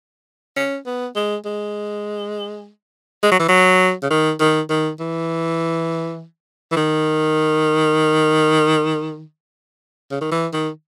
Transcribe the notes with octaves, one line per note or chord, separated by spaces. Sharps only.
C#4
B3
G#3
G#3
G#3
F#3
E3
F#3
C#3
D#3
D#3
D#3
E3
E3
D#3
C#3
D#3
E3
D#3